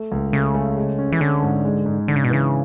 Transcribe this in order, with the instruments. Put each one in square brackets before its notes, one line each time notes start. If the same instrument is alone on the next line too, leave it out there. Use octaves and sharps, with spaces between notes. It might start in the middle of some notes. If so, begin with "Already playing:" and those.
Already playing: [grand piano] A3
C#2
[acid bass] C#3 [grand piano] A3
[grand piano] A3
G#3
C#4
[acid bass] E3
[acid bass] D3 [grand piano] C#4
[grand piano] G#2
G#3
G#2
[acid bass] D3 [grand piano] D4
[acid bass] C#3
B2
[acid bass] C#3 [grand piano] E3